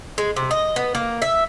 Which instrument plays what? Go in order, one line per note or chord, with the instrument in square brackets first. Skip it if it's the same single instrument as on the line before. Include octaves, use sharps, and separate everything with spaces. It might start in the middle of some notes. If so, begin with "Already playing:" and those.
[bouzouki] G#3
C3
D#5
B3
A#3
E5